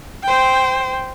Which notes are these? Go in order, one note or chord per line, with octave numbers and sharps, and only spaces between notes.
C5 G5